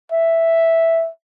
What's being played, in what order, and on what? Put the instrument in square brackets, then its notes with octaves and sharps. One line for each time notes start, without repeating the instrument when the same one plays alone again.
[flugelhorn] E5